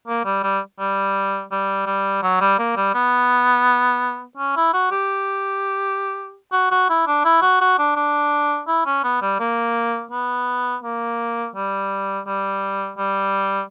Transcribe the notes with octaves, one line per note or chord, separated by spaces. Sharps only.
A#3
G3
G3
G3
G3
G3
F#3
G3
A#3
G3
B3
C#4
E4
F#4
G4
F#4
F#4
E4
D4
E4
F#4
F#4
D4
D4
E4
C#4
B3
G3
A#3
B3
A#3
G3
G3
G3